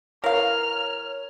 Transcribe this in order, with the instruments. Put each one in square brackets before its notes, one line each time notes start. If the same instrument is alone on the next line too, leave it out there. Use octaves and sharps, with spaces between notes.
[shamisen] E3 F5 [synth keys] A#4 [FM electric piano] C#5 [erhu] F6